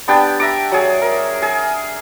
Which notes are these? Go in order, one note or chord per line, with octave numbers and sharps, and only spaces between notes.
B3 D4 G4 G5
E5 A#5 D6
F#3 G#4
A#4
G#4